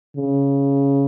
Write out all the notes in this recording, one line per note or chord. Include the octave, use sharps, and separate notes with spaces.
C#3